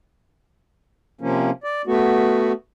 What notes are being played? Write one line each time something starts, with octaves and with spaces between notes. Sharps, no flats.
C3 F3 A#3 C#4
D5
A3 B3 F#4